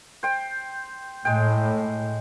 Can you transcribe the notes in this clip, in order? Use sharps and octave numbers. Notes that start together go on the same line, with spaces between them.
C5 G5
A2 G#3 G5